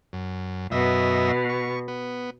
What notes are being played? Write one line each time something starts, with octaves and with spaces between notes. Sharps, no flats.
F#2
F#2 B2 D#5 E5
C#6
B3